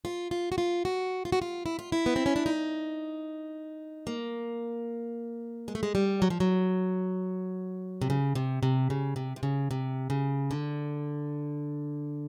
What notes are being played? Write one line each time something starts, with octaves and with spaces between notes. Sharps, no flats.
F4
F4
F#4
F4
F#4
F4
F#4
F4
E4
F4
E4
B3
C4
C#4
D4
D#4
A#3
G#3
A3
G#3
G3
F#3
F3
F#3
C3
C#3
C3
C3
C#3
C3
C3
C#3
C3
C#3
D3